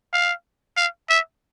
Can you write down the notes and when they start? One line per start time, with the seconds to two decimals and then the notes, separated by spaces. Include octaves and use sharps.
0.13 F5
0.77 F5
1.09 E5